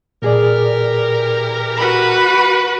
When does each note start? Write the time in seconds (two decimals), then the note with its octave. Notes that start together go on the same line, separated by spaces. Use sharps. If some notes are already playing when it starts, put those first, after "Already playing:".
0.22 A#2 E3 G4 G#4 A#4 D5
1.78 F#4 B4 B5